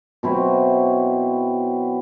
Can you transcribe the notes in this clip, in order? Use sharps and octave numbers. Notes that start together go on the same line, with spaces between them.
B2 F#3 C4 E4